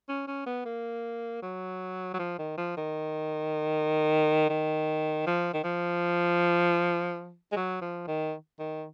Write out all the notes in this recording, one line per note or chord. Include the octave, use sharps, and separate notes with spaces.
C#4
C#4
B3
A#3
F#3
F#3
F3
D#3
F3
D#3
D#3
F3
D#3
F3
G#3
F#3
F3
D#3
D#3